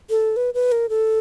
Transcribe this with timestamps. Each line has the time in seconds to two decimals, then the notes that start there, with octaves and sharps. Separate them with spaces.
0.10 A4
0.36 B4
0.54 B4
0.72 A#4
0.89 A4